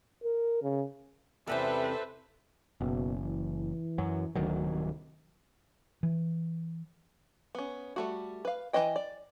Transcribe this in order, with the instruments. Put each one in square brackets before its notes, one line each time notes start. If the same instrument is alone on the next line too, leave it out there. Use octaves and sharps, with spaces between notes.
[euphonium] A#4
C#3
[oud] E2 C3 C#4 [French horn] G3 [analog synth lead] A4 [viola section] B4 C5 E5
[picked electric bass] F#1 [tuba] B2
[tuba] E3
[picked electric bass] F#2 F#3
[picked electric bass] D1 D#3 F#3 [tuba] D2
[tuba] C2
[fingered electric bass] E3
[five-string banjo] B3 C#4
G3 A3 F#4
B4 F5
E3 E4 B4 D#5 G5
D5